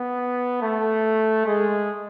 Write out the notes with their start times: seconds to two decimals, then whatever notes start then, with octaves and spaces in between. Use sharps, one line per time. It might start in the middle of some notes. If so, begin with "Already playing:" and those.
Already playing: B3
0.62 A3
1.46 G#3